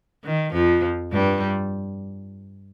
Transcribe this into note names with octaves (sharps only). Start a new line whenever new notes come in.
D#3
F2 F3
G2 G3